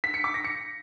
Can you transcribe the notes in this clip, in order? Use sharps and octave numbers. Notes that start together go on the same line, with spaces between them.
B6
C#7
D6
A#6
C#7